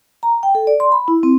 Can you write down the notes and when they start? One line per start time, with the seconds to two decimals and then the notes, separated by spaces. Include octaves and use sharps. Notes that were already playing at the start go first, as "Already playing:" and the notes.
0.23 A#5
0.43 G5
0.55 A4
0.67 D5
0.80 C6
0.92 B5
1.08 E4
1.23 C4